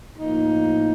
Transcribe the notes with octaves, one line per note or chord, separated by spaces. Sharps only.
A2 F3 A#3 D#4